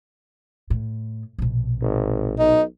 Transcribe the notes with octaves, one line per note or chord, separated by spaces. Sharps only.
A2
A#1 B2
G#1
B1 D#4